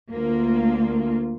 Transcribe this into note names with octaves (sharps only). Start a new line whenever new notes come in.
D2 A#3 F4